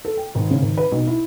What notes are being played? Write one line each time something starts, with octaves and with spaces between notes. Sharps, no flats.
A4
G5
G#1
C#3
G#1
B4
B1
E4